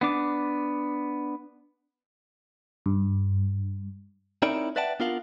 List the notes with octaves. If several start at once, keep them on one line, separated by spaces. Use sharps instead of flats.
B3 D4 D6
G2
C4 D#4 E4 A#4 C#5 D5
B4 D5 E5 F#5 G5 A5
B3 D4 F4 A#4 F5 F#5